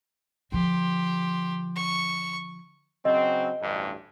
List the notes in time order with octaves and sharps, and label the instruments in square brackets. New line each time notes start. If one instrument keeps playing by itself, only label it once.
[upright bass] D3 F3 [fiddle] G4 C6
[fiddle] C#6
[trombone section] C#3 F#3 C4 [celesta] D#5
[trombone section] A1 D2 G2